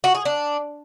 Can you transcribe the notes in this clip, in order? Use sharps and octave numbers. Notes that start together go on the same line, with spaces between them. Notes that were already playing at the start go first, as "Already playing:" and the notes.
F#4
G#4
D4